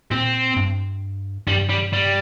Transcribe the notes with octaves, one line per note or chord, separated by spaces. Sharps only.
A#2 C4
G2
G2 G3
G3
G3